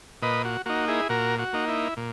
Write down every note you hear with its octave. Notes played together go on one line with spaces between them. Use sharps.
A#2 B4 D#5
F#4
A#3 D#4 F#4
E4 G#4
A#2 F#4 A#4
F#4
A#3 D#4
E4
A#2